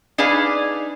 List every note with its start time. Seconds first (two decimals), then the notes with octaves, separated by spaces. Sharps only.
0.18 D4 D#4 G#4 B4 F5